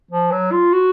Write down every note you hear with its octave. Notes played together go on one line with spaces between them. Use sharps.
F3
F#3
F4
F#4